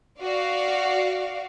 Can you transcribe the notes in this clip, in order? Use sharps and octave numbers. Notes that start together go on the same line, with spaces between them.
F#4 D5 F5